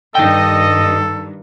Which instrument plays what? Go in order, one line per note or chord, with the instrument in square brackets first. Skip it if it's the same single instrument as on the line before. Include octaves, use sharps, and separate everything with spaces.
[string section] G2 D#3 [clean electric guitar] D#4 G5 [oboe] A4 [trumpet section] D#5